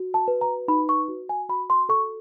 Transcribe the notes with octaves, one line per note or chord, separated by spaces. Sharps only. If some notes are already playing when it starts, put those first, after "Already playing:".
Already playing: F#4
A5
B4
A#5
D#4 B5
C#6
F#4
G#5
F#4 B5
C6
A4 C#6